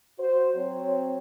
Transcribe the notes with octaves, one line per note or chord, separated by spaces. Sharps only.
F#4 C5
F#3 C4 C#5